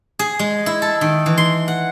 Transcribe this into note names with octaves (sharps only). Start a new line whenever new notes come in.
G#4
G#3
E4
A4
D#3
E3
C6
F#5